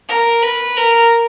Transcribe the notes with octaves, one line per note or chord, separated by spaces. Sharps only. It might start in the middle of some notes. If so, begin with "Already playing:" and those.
A#4
B4
A#4